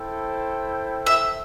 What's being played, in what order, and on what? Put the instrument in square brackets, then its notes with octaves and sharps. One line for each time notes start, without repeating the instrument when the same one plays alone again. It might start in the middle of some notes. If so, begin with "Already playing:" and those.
Already playing: [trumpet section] E4 A4 C5 G5
[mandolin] E5